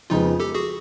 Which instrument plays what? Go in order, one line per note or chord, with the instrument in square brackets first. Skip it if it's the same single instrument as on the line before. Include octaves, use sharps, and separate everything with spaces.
[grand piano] F2 C#3 F3 G#3 B3 [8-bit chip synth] D#4 F4
[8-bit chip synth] G4 A4
F#4 G#4